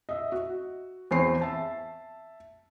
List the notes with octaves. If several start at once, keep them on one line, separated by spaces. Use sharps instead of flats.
D#5 E5
F#4
E2 C4 C7
E5 A5